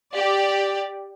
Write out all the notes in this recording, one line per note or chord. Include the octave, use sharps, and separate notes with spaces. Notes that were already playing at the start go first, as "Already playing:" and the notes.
G4 D5